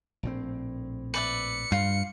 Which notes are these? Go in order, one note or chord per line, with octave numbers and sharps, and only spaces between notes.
A#1 A2 C4
B4 D5 E5 C#7
G2 F4